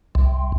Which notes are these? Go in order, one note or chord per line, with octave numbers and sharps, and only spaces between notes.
C2